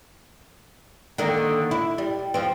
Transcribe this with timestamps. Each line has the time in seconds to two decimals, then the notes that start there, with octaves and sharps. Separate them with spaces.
1.18 D3 D#3 A#3
1.71 E4
1.98 G3
2.34 F3 C4